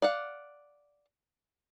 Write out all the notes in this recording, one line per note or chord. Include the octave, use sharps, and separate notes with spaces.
D5 F5 F#5